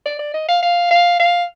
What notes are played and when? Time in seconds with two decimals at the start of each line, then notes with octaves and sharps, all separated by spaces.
0.06 D5
0.19 D5
0.34 D#5
0.49 F5
0.62 F5
0.91 F5
1.19 F5